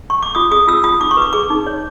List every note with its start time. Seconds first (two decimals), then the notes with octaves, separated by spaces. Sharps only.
0.10 C#6
0.23 D6
0.35 F4 D#6
0.51 G#4 D#6
0.67 F4 E6
0.84 F4 D#6
1.00 D#4 D6
1.11 C#6
1.17 B4 D6
1.33 G#4 D6
1.50 D#4
1.66 C#5